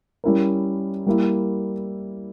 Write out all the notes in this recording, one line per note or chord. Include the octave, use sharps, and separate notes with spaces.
G3 C#4 E4 A#4
G3 A#3 E4